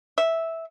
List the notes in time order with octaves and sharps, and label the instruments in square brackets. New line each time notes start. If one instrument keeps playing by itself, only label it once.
[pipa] E5